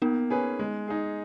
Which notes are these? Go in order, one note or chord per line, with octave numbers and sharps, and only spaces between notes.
A#3 B3 D#4
C#4 G#4 B4
G#3
D#4 G#4